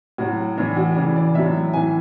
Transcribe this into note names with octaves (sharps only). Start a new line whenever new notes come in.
A2 F#3 F#4
A2 E3 D4
F#4
C#3 E3 D5
D5
A2 F#3 E5
A2 E3 G#5